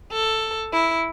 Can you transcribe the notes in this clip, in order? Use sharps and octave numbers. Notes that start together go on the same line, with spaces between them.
A4
E4